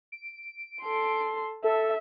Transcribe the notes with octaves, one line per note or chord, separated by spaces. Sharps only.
D7
A4 C6
A4 E5